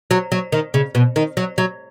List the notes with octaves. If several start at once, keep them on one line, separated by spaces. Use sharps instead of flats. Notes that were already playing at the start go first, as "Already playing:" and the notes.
F#3
F#3
D#3
C#3
B2
D#3
F#3
F#3